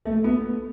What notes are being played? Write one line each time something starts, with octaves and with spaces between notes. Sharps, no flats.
A3
B3